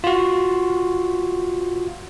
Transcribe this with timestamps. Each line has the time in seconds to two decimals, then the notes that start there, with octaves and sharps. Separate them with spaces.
0.04 F4 F#4